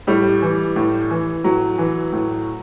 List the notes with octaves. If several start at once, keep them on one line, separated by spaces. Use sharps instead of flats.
A2 G3
E3
A2
E3
A2 F#3
E3
A2